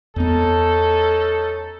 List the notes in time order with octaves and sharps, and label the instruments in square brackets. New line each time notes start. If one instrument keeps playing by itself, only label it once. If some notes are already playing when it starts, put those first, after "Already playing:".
[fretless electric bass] E2 B3 [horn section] C#4 D#4 A4